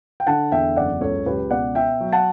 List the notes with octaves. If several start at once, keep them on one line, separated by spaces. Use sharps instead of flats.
G5
D3 F#5 A5
E2 E5 G5
F#1 D5 F#5
C#2 A4 C#5
C#2 G4 B4
B2 D5 F#5
B3 E5 G5
F#3
F#5 A5